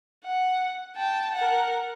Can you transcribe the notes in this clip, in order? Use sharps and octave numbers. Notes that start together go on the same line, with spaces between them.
F#5
G5 A5
A#4 F#5